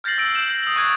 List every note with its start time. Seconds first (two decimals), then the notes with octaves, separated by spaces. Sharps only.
0.04 F6 G6 A6 A#6 C7 F#7
0.18 E6 A#6 D7 F#7
0.34 G6 D7 E7 F#7
0.48 G6 C7 F#7
0.63 D#6 F#7
0.76 C#6 F#6 G#6 C7 D7